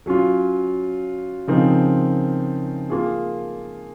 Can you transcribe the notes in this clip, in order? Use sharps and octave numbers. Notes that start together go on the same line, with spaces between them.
F#3 C#4 F4
C#3 F3 C4 D#4 A#4
A#3 F4 G#4